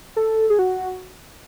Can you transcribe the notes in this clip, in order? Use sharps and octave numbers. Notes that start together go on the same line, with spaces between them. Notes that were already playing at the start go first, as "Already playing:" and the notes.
A4
G#4
F#4